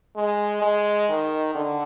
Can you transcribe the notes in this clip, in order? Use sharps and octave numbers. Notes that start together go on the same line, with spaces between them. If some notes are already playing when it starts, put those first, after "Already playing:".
G#3
G#3
D#3
D3